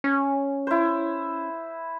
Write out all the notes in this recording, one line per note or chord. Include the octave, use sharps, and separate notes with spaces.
C#4
E4 C5